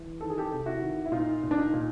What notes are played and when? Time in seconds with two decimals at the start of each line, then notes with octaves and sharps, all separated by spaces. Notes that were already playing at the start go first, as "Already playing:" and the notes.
Already playing: E3
0.21 D#3 A4
0.30 G#4
0.38 G4 A4
0.52 C3
0.66 E4 F#4
0.81 D#3
1.05 E4
1.12 A#2 D#4 F4
1.43 A#2
1.51 D4
1.57 D#4
1.74 A#2